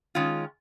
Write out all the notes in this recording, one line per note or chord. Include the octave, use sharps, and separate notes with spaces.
D#3 G#3 C#4 F4